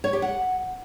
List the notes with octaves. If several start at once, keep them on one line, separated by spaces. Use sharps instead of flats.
C#5
G4
F#5